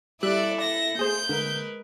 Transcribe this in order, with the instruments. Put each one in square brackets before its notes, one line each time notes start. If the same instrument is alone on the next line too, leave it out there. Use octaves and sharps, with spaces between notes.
[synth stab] G3 E5 F#6 [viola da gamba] E4 A4 [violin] D5
[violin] A#6
[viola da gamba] A3 [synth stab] G#4 C5 [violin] G6
[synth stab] D3 [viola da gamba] G#3 A#4 B4